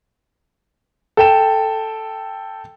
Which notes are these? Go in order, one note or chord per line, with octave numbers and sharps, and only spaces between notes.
A4 G5 E7